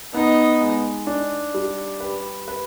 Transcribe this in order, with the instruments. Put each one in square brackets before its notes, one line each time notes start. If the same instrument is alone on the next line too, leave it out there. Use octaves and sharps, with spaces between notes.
[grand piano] B3 [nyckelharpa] D#4
[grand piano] G#3
D4
G3
[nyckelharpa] G4 [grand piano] B4
[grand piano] B4